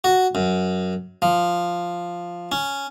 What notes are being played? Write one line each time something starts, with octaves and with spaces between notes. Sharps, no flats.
F#4
F#2
F3
C#4